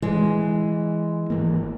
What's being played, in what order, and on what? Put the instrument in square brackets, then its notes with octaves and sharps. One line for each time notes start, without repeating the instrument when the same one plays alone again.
[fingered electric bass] E3 [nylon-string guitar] G#3
[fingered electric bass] G#1 E3 A#3